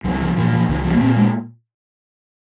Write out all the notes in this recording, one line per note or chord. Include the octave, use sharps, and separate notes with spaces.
C2 F#3
F3
A#2 F3
F3
C2 D#3
F3
A#3
A#2 C4
G#3